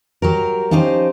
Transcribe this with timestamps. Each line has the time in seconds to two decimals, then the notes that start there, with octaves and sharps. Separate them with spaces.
0.22 F#3 G4 A#4
0.71 F3 C#4 D#4 G4 C5